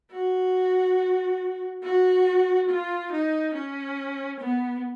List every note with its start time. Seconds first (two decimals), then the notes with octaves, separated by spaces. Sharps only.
0.12 F#4
1.83 F#4
2.68 F4
3.11 D#4
3.54 C#4
4.39 B3